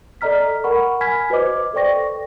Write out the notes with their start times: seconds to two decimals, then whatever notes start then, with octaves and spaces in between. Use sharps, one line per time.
0.21 A4 D5 D#5 A#5 F6 B6
0.64 A#4 F#5 B5 C#6
1.01 G#5 B5 F6 G#6 B6
1.30 F#4 B4 C5 D#5 D6
1.74 A4 C5 D5 G5 C#6 A#6